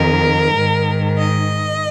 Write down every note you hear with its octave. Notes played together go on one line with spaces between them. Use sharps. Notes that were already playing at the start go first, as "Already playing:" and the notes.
Already playing: F2 D#3 A#4
G#2 D#3
D#5